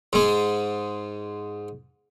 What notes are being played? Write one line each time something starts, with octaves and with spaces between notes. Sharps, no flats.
G#2 G#3